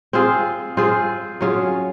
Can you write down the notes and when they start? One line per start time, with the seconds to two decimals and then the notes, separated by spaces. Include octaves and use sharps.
0.13 C4 F4 G#4
0.77 C4 F4 G#4
1.41 F#3 C#4 F4 G#4